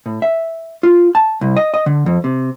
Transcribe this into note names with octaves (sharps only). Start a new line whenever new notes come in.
A2
E5
F4
A5
C2
D#5
D#5
D3
F2
C3